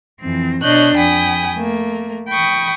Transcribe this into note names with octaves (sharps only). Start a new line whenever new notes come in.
F2 E3 C4
B2 D4 C#5 D#5 F#6 G6
F2 G5 G#5 B5 D#6
A3 A#3
G5 B5 C#6 D#6